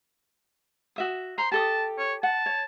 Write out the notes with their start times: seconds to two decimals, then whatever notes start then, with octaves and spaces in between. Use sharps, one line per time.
0.96 F#4 E5 D#6
1.38 C5 A#5 C6
1.52 G4 A4 A5 D#6
1.98 C#5
2.23 F#5 A5
2.46 C#5